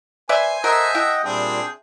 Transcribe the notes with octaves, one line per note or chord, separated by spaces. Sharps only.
B4 C5 D5 E5 G#5
A4 A#4 C5 D#5 E5 F#5
E4 D#5 F#5 G5
A#2 G3 C4 D4 G#4 G5